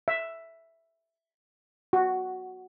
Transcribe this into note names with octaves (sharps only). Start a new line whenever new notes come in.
E5
F#4